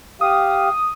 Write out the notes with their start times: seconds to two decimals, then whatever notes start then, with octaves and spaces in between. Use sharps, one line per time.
0.21 G4 F5 D#6